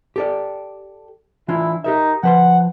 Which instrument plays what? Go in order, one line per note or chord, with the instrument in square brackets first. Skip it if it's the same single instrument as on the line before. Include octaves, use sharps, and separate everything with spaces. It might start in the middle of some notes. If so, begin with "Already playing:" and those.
[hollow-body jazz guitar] G4 A4 D5
[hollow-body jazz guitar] E3 D4 F4 [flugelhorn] E4
[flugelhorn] D#4 [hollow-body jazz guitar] G4 A#4 E5
[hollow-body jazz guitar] F3 B4 C6 [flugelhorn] F#5